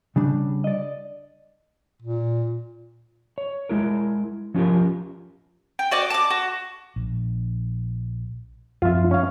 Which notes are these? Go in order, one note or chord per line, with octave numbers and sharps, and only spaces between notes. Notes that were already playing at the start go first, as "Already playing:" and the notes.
C#3 G3 D4
D5 D#5
A#2
C#5
G#3 E4 A#4
F3 C#4 F4 G4 A#4
G5
F#4 D5 D#5 D6
A5 D6
F#4
A#1
F#2 F3 C4 F4 E5
C#4 F5